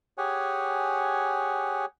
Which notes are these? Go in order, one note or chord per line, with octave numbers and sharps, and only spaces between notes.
G4 G#4 C#5 F#5 G#5